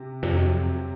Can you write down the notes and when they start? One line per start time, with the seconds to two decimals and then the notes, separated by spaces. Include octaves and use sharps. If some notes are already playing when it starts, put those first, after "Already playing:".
Already playing: C3
0.23 F2 C3
0.35 F#3